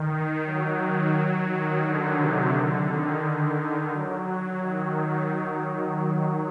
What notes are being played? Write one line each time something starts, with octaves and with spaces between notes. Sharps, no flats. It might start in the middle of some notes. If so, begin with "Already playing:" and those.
Already playing: D#3
F#3
F#3
D#3
D3
C3
D3
D#3
D#3
F#3
D#3